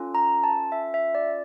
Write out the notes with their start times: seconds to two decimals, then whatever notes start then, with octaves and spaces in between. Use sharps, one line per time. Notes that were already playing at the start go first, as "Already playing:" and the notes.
Already playing: C#4 F4 A4
0.15 A#5
0.44 A5
0.72 E5
0.94 E5
1.15 D5